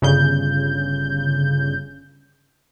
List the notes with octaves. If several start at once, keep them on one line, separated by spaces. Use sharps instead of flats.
G1 C#3 G6